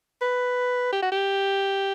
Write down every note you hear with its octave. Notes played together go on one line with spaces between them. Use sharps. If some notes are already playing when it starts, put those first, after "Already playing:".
B4
G4
F#4
G4